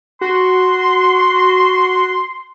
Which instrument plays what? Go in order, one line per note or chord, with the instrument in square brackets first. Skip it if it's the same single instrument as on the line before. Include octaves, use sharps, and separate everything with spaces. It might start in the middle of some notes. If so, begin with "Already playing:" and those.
[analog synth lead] F#4 [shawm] C6